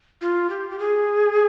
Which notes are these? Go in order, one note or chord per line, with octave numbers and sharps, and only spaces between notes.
F4
G4
G4
G#4